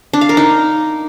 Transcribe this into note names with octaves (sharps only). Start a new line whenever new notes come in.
D4
F5
A#4
D#4